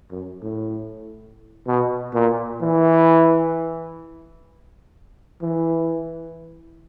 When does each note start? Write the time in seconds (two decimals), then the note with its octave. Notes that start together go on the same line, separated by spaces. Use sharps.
0.11 F#2
0.43 A2
1.67 B2
2.14 A#2
2.61 E3
5.42 E3